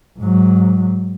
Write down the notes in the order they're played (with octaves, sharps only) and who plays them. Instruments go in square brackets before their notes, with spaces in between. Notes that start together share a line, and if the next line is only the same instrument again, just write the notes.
[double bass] G#2 F#3